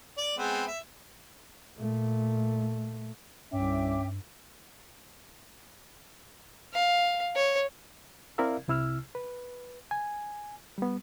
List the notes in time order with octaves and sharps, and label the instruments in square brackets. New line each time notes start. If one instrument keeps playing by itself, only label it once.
[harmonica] D5
G#3 B3 C4
E5
[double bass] A#2 A3
[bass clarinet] C2 [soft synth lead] G2 [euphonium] C#4 [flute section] E5 G5 D6
[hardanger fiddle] F5
C#5
[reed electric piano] C4 E4 A#4 D5 E5 F5
C2 C3 E4 E6 F6
B4
G#5
G3 B3